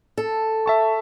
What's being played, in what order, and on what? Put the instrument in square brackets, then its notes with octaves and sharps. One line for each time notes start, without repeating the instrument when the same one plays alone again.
[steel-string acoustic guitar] A4
[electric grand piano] E5 A5 C#6